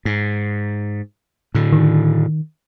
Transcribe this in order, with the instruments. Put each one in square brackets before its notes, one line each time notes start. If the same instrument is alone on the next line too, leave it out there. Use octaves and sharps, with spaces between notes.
[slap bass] G#2
A2 D3
[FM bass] D#3